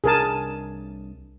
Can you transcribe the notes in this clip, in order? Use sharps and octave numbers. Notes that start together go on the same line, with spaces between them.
C2 D4 G#4 A#4 A5